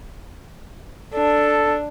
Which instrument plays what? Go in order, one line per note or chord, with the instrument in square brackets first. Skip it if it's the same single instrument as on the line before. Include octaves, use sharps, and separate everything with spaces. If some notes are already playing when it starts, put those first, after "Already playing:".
[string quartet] D4 [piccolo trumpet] A4